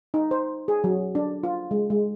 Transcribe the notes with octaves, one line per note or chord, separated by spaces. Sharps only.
D#4
C5
G#4
F#3
D4
F4
G#3
G#3